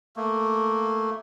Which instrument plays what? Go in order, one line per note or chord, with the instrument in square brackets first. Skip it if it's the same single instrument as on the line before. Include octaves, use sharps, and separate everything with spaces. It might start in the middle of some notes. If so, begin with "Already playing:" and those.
[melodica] A3 A#3